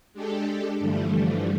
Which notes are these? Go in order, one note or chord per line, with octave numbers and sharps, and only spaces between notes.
G#3 D4 G4 A4
G2 D3 E3 F3 G3 A3